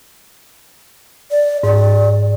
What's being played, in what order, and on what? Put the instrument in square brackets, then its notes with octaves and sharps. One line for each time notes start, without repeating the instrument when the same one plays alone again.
[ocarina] D5
[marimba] G#2 [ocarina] D5